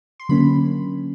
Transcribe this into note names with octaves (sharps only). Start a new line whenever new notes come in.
C6
D3 F#3 A#3 C#4 B5